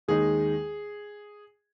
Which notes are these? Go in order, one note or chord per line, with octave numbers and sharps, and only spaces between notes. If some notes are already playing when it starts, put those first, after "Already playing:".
D#2 D#3 G#3 D#4 G#4